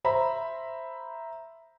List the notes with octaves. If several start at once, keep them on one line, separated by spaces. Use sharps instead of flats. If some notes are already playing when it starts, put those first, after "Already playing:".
C5 E5 A#5 B5